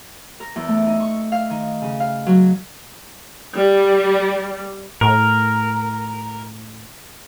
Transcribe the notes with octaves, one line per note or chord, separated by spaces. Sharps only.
A#4
E2
A3
D#4
C#6
F5
D#3
C#3
F5
F#3
G3
A2 A#4